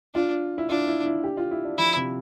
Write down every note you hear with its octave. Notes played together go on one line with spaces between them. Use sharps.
D4 F4
E4
D4 F4
E4
E4
G4
F4
E4
D4
F3 E4
C3